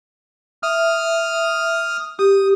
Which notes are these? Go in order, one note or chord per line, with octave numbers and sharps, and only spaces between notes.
E5 D#6 F6
G4 D#6